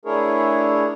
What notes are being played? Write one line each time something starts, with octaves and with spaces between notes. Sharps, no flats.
A3 D4 E4 G#4 A#4 C#5